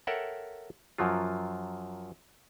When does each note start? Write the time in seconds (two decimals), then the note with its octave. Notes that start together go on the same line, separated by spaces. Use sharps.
0.07 A4 A#4 C#5 E5 F#5 G5
0.98 F#2 F3 F#3 F4